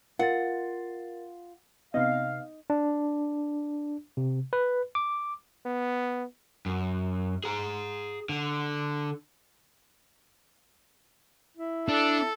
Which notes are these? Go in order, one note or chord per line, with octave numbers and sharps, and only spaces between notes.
F4 A#4 F#5 A6
C3 B3 D#4 D#5 F5
D4
C3
B4
D6
B3
F#2
G#4 A#5
D3
E4
D4 A4